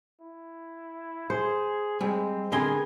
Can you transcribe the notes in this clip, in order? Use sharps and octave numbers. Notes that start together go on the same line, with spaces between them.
E4
G#4 C5
G3 G#3 C4
D3 B3 C4 G#4 A#4 G#5 C6